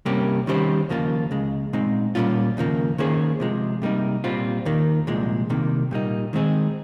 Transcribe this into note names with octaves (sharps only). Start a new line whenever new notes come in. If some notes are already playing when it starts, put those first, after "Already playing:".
C3 G3 A#3 C#4 G4
D#3 G3 C#4 G4 C5
D#2 C#3 F3 A#3 F4
C#2 C#3 G#3
A#2 G#3 C4 D#4
A#2 G3 A#3 C#4 F4
D#2 C#3 F3 A#3
D#3 A#3 C#4 G#4 C5
C3 F3 G#3
C3 G3 A#3 D#4 A#4
A#2 G3 C4 F4
D#2 D#3 A#3
C2 A#2 F3 G#3
C2 C3 D#3 A#3
A#2 G3 A#3 D#4
D#3 G#3 C4 D#4 G#4